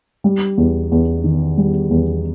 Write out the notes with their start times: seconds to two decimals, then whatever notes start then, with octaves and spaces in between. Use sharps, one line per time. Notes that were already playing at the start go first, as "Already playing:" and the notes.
0.24 G3
0.58 E2
0.92 E2
1.24 D#3
1.57 G3
1.91 E2